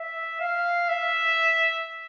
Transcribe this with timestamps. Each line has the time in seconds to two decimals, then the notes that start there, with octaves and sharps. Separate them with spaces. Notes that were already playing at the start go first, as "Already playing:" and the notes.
Already playing: E5
0.40 F5
0.89 E5